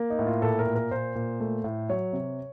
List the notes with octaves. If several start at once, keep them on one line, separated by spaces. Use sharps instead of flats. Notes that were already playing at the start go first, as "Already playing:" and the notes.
Already playing: A#3
D#4
A2
F4
A#2 A4
A#4
A#2
A#4
A#2 C5
A#2
A3
A2
F#3 C#5
C3